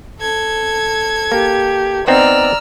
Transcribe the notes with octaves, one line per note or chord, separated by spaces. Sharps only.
A4 G#6
A#3 G4
B3 C4 D#4 D5 A#5 E6 F6